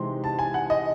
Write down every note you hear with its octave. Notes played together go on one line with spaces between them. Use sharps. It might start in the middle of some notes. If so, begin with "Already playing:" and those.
Already playing: C3 E3 G#3 C4 D#4 C6
A5
G#5
F#5
D#5